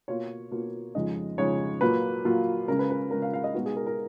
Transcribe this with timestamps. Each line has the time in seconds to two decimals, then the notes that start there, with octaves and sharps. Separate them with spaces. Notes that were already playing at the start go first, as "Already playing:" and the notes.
0.08 B2 A#3 F4 C#5
0.51 B2 A#3 F4
0.95 F2 C#3 G#3 D#4 D#5
1.38 F2 C#3 G#3 D#4 C#5
1.81 A#2 F#3 A#3 F4 B4
2.25 A#2 F#3 A#3 F4
2.68 C#3 G#3 C#4 A#4
2.79 B4
2.90 B4
3.11 C#3 G#3 C#4 A#4
3.22 F5
3.34 F5
3.44 D#5
3.54 B2 G#3 B3 D#4 F#4
3.66 G#4
3.76 A#4
3.86 A#4